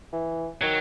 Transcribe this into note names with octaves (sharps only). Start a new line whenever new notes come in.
E3
D#3 F#3